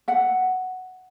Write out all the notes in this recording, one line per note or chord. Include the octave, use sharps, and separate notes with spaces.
E5 F#5